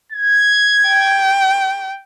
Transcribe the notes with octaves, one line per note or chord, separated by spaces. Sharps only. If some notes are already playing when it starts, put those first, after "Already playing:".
G#6
G5